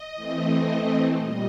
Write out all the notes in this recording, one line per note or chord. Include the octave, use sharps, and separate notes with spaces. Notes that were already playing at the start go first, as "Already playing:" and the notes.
Already playing: D#5
E3 A3 C4
A#2 G3 D#5